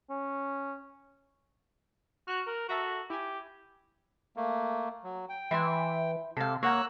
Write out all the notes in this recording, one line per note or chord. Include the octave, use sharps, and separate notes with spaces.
C#4
F#4 F6 F#6
A#4
F#4 A4 E5 A#5
E4 G4 G#5
A3 A#3
F#3
G5
E3 E4 E5 C6
C3 A4 F5
A#3 C#5 F#5 A#5 E6 F#6